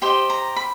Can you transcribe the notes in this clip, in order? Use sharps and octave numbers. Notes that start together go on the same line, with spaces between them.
G4 C5 D#5 C6
A#5
B5